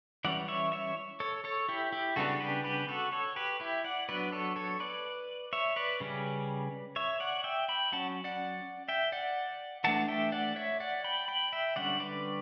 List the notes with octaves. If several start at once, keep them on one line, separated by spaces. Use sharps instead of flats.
E3 G3 C#4 D5 F#5
C#5 E5
C#5 E5
A4 C#5
A4 C#5
E4 G4
E4 G4
C#3 G3 B3 D4 F#4 A4
G4 B4
G4 B4
F#4 A4
A4 C#5
G4 B4
E4 G4
D5 F#5
F#3 B3 D4 B4 D5
A4 C#5
A4 C#5
B4 D5
C#5 E5
B4 D5
C#3 G3 C#4
C#5 E5
D5 F#5
E5 G5
G5 B5
F#3 C#4 F#5 A5
D5 F#5
E5 G5
D5 F#5
E3 A3 D4 F#5 A5
E5 G5
D5 F#5
C#5 E5
D5 F#5
G5 B5
G5 B5
E5 G5
D3 G3 C#4 D5 F#5
B4 D5